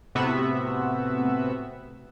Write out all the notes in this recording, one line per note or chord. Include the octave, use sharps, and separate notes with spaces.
A2 C3 B3 F#4 E5